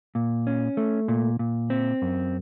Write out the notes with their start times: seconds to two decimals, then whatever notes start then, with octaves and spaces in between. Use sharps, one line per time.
0.15 A#2
0.47 C#4
0.77 A3
1.08 A#2
1.39 A#2
1.70 C4
2.02 F#2